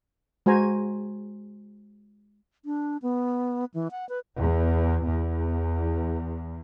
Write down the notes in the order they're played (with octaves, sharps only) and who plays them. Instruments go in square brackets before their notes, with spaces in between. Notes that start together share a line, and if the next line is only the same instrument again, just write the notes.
[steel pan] G#3 F#4 C5 G#5 A#5
[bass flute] D4
B3
E3
F#5
B4
[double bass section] E2
E2